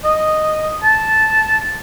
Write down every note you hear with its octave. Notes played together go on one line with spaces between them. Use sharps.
D#5
A5